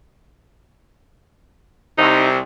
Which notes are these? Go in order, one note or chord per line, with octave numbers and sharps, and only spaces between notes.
C2 C3 D#4